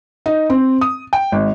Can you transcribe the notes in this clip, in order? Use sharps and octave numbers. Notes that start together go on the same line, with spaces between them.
D#4
C4
D#6
G5
G#1